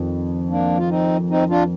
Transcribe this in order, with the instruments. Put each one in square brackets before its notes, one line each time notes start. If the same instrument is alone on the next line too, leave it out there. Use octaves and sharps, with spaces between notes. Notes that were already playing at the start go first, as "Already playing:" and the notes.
Already playing: [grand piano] F2 D#3
[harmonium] A#3 D4
F4
C4 D#4
C4 D#4
D4 F4